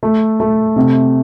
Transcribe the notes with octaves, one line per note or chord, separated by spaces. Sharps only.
A3
A3
C3